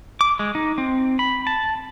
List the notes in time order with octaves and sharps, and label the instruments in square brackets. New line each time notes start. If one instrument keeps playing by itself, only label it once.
[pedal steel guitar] D6
G#3
D#4
C4
B5
A5